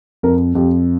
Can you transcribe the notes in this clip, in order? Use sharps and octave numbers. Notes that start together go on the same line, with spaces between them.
F2 A#4
F2 G4